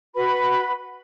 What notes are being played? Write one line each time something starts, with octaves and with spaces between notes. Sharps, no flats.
F#4 B4 B5